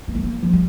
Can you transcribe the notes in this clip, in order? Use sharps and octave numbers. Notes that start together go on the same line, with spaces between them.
A#3
A3
A#3
A#3
F3
G3